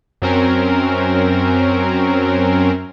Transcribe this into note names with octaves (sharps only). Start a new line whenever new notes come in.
F#2 F#3 C4 C#4 A#4